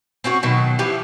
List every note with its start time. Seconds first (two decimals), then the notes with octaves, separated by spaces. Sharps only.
0.24 C4 C#4 F#4 C#5
0.43 B2 D#3 F#3
0.79 E3 F3 G4